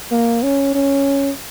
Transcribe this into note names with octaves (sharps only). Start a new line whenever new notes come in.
A#3
C#4
C#4